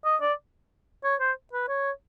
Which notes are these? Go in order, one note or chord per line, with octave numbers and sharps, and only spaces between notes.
D#5
D5
C#5
C5
B4
C#5